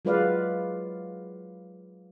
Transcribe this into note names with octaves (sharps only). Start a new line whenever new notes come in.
F#3 G#3 F4 B4 D5 F5